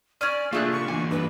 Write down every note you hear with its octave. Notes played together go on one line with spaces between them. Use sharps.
C#4 D5 F6 D#7
A3 A#3 D4 E4 F4 G4 G#4 F#6
C#6
D3 E3 A#3 G#5
G2 B4